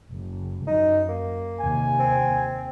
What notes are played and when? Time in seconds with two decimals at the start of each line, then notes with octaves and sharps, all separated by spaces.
0.12 F#1
0.67 F#2 D#4
1.09 A#3
1.60 D#2 C3 G#5
2.00 C4